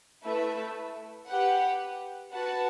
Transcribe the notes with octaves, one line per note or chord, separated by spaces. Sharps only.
A3 E4 B4 E5
G4 B4 F#5
F#4 B4 F#5 A5